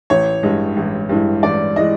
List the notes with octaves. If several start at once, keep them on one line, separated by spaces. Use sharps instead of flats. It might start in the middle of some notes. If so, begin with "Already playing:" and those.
A1 C#5
G2 E3 G#3
A1
G2 E3 G#3
A1 D5
E3 G#3 D#5